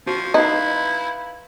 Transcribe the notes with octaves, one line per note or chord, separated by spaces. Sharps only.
F3 F#4
D#4 E4 B4 F5